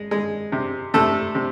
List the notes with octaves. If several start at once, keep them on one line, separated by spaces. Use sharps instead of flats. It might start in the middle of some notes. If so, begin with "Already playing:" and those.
Already playing: G#3
G#3
C3
C3 A3 A4
C3